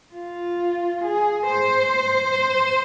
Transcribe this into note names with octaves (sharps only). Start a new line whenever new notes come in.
F4
G#4
C5